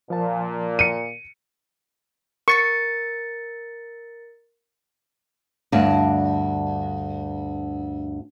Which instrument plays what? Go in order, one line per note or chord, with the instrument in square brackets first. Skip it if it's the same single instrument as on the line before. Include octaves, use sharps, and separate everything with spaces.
[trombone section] A#2 [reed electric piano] F3 A5
[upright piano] C#7 D#7
[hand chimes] A#4 A6 C#7 [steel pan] C#6
[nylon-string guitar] D2 G2 D4